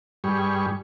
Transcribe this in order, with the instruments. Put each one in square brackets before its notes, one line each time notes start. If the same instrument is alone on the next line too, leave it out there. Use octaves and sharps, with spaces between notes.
[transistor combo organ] G2 G3 G#4 C#6